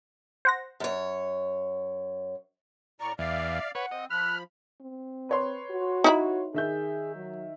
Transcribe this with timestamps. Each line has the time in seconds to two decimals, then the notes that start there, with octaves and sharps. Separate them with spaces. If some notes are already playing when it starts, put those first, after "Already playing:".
0.45 C5 F#5 A#6
0.80 F#2 C#5
3.00 A2 D5 A#5 C#6
3.19 E2 D5 E5 F5
3.75 B4 C#5 F#5
3.91 C4 D#5
4.10 F3 B5 F6 F#6
4.81 C4
5.29 B4 C#5 C6
5.70 F#4
6.04 D#4 E4 B5
6.54 D#3 G#4 E5 G6
7.15 F#3